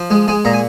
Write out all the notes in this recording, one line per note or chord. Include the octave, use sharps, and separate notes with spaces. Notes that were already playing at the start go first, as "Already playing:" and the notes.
Already playing: F3
G#3
G#3 G#5
A#2 A#5
G#5